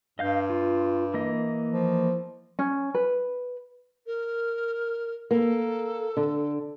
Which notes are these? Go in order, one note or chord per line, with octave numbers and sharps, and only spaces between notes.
G2 D#5 F5 G6
F4
E3 A#3 D#5
F3
C#4
B4
A#4
A#3 A4 A#4
D3